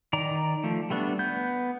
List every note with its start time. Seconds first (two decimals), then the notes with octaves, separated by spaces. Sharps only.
0.13 D#3 D5 A#5
0.64 F3 A3
0.90 G3 A3 B3 D4
1.19 B3 G6